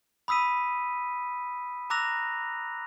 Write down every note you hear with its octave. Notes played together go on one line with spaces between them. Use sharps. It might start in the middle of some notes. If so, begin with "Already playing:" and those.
B5 D#6 E6 B6 D#7
A#5 D6 E6 F#6 A#6 F7